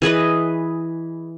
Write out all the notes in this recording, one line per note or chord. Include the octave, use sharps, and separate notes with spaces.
E3 G#4 B4 D#5